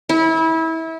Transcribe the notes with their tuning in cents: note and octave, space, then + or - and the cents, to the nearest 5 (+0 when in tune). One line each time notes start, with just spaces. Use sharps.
E4 -25